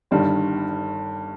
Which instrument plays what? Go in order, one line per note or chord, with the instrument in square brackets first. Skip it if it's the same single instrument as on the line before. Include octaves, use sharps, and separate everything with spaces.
[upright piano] G1 G2 D#3 G3